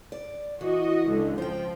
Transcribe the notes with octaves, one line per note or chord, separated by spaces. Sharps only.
D5
E3 F#4 D#5
C#2 D3
F3 C5 G5